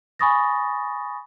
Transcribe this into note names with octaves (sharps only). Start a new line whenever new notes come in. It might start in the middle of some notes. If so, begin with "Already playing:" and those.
G#5 B5 C#6 D#6 A6 A#6